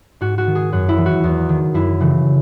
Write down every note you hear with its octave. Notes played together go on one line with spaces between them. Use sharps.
G#2 F#4
F#4
D#3
G#4
F#2 F#4
E4
E3
F#4
E2
D#3
F#2 E4
C#3 E3